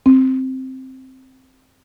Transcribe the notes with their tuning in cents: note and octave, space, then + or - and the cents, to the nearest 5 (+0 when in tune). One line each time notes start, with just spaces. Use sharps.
C4 +0